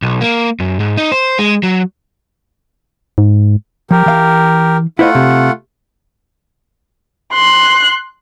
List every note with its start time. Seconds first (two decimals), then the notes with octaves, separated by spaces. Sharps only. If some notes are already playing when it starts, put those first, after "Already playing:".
0.02 B1
0.21 A#3
0.60 F#2
0.80 G#2
0.97 D#4
1.12 C5
1.39 G#3
1.63 F#3
3.18 G#2
3.91 F3 G4 A#4
4.06 E3 F5
4.99 A3 E4 F4 C5 D#5 F#5
5.15 C3
7.33 C6 F#6